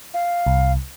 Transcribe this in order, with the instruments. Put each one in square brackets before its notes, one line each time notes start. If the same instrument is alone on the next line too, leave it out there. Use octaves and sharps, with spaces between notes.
[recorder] F5
[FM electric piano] C2